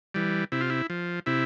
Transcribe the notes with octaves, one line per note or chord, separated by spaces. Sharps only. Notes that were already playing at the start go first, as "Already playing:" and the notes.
E3 G3
C3 E4
F4
E4
F3
C3 E4